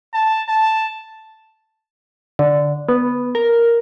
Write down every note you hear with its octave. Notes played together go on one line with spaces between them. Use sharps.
A5
A5
D3
B3
A#4